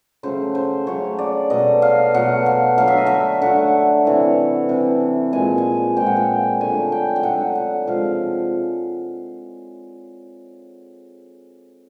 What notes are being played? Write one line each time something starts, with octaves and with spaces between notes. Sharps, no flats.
C#3 F#3 A3 C5
C5
C#3 F#3 A3 C#5
D5
B2 F#3 A3 D#5
F5
B2 F#3 A3 F#5
F5
D3 F#3 A3 F5
E5
D#5
E5
D3 F#3 A3 F#5
C3 E3 A3
C3 E3 A3
A#2 F3 G#3 G#5
G#5
A#2 F3 G#3 G5
F#5
G5
D3 F#3 A3 G#5
G5
G5
D3 F#3 A3 F#5
F#5
C3 F3 G#3 F5